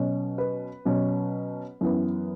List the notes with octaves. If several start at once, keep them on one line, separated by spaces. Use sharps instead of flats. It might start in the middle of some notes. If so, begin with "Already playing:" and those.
Already playing: B2 F#3 C#4
B4
B2 F#3 C#4
F#2 E3 B3